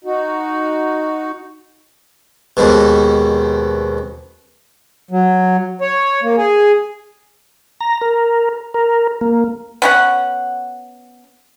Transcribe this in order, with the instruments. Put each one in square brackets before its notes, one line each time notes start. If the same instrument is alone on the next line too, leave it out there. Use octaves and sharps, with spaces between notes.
[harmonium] D#4 F#4
[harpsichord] D#2 G#2 B2
[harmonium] F#3
C#5
A#3
G#4
[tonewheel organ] A#5
A#4
A#4
A#3
[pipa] B3 C#4 F#5